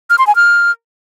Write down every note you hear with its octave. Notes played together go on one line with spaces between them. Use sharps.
F6
C6
G#5
F6